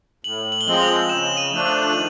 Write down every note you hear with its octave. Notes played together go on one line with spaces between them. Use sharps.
A2 F#7
F#7
G7
F3 G#3 C4 F#7
F7
C#3 E7
D#7
F3 A3 D4
F#7
D#3 F#7